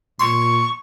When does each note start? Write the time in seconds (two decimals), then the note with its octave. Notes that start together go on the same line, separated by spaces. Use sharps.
0.20 A#2 C6 C#6